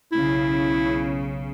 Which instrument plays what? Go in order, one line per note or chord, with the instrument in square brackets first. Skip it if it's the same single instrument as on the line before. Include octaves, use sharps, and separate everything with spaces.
[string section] B1 C#3 [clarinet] E4